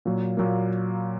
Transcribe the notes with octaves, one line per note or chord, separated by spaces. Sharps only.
A#2 F#3 A#3
A#2 F#3 A#3